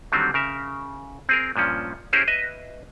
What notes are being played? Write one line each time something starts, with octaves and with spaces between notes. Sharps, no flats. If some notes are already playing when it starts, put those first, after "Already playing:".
D3 D#3 F#3 G3 C4
C#3 A#4 E5
C4 G#4 A#4
G2 A#2 F3 C#4
C#4 E4 G4 G#4 A#4 C5
B4 D#5 E5